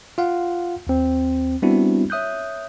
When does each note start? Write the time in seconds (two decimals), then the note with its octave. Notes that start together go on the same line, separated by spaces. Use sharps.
0.18 F4 F5 F#5
0.87 D#2 C4
1.62 G3 B3 C4 D4 E4 F#4
2.10 C#5 E5 D#6 F#6 G6